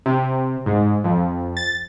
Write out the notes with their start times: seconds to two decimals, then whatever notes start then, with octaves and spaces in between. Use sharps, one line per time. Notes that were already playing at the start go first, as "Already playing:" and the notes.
0.06 C3
0.66 G#2
1.04 F2
1.57 A6